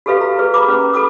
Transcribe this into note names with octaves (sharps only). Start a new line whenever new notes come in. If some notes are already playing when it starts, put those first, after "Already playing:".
F#4 G4 A4 B4 E5 F5
A#5
G#4 B4
A#4 A#5 B5 D6
C#4 B4
F#4 A4 B5 D6 D#6